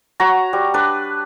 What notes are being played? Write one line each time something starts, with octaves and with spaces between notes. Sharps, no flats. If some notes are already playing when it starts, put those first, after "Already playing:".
F#4 C#5 A#5
G3
D4 B4